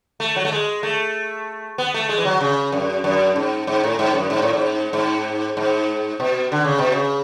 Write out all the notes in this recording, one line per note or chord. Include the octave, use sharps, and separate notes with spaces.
A3
F#3
A3
G#3
A3
B3
A3
G#3
E3
F#3
C#3
F#2
F#2
G#2
G#2
A2
G#2
F#2
G#2
A2
G#2
G#2
G#2
B2
D3
C#3
B2
C#3